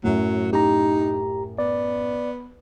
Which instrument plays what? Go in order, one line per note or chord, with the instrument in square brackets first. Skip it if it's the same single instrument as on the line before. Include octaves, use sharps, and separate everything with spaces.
[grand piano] F#2 A2 [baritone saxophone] F#3
[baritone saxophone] D#4 [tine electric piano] G4 A#5
[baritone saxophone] B3 [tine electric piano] D5